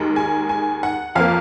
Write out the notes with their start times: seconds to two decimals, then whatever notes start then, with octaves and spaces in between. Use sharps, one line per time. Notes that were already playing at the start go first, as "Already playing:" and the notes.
Already playing: D#2 D#3 G#3
0.16 G#5
0.49 G#5
0.83 F#5
1.15 F2 F3 A#3 F5